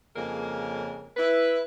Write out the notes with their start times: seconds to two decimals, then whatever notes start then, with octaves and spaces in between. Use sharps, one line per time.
0.16 F2 C#3 G#3 A#3 A#4
1.16 E4 B4